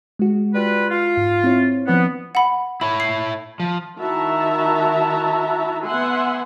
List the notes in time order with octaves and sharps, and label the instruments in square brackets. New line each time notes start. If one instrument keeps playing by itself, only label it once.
[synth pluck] G#3 F#4
[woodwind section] G3 F4 B4
F4
[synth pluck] G#2 F5
C4 E4 C#5
[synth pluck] F3 C4 D4 [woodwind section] B3
[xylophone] F#5 B5
[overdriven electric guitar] E4 C#5 [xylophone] B5
[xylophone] C7
[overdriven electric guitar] F3
[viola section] D#3 E4 F#4 E5 A5 A#5
B3 E5 F#5 G#5 C6